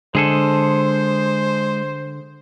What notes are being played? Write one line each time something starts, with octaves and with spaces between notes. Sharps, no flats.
D3 G#3 G#4 A4 C5